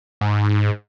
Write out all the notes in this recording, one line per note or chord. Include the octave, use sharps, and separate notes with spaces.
G#2